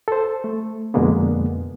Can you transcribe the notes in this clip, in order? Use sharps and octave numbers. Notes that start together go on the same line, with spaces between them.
A4 C5
A3
F2 B2 D3 G#3 A#3 B3